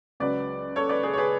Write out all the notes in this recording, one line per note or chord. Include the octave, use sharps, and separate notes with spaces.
C#2 C#3 F#3 B4 D5
A4 C#5
B4 D5
G#4 B4
C#5
G#4 B4